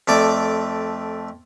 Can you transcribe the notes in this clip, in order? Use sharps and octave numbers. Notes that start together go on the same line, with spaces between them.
F2 A3 D5 D6